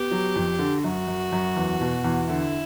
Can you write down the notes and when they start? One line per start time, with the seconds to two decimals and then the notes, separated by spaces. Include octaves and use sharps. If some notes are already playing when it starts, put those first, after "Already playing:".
Already playing: B3 G4
0.11 F#3
0.36 F2
0.59 D3
0.84 F#2 F#4
1.07 F#2
1.32 F#2
1.56 E2
1.80 B2
2.04 E2
2.28 D3 E4